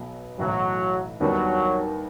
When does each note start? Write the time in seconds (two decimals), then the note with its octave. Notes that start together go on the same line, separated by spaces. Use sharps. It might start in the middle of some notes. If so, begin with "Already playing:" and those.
Already playing: B1 B2 F#3 B3
0.39 B1 A2 E3 F#3
1.20 D#2 D#3 F#3 G3 B3 D4